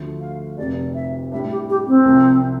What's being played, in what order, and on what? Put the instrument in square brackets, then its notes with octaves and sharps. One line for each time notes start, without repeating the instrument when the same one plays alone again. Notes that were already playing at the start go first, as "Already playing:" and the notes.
Already playing: [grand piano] D2 D3 F3 A3
[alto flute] F5
[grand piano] F1 F2 C3 [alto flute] D5
[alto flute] E5
[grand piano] A2 G3 D4 [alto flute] E5
[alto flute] G4
G4
C4
[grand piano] C2 C3 F3